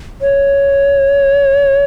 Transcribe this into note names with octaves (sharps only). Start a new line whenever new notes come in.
C#5